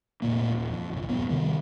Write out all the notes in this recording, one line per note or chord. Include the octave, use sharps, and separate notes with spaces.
F1 C#2 A#2 A#3
D#1
F2
G1 C2
D#1 G2 B3
C3 D#3 G3